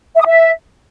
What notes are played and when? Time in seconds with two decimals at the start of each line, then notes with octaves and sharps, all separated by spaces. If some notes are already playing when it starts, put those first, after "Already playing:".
0.16 E5
0.21 D#6
0.27 E5